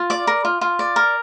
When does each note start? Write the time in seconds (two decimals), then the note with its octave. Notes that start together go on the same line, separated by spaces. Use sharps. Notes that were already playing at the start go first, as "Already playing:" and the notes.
Already playing: F4
0.10 D5 D6
0.27 A#4
0.45 F4
0.61 F4
0.79 D5
0.96 A#4